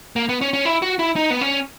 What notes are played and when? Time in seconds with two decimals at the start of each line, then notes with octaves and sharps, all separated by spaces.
0.16 A#3
0.29 B3
0.41 C#4
0.53 C#4
0.65 E4
0.82 F#4
0.99 E4
1.16 D#4
1.30 B3
1.41 C#4